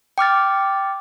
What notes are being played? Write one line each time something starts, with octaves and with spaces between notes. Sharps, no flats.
G5 D6 F6 A6